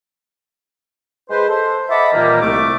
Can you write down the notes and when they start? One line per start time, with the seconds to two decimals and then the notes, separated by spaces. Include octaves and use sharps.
1.30 G#3 B4 C5
1.48 A4 C5
1.89 D#5 E5 F#5 A5 B5 D6
2.13 A#2 D#3 E3 G3 A#3
2.41 C2 A3 D6